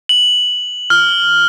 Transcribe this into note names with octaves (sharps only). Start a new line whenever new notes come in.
F#7
F6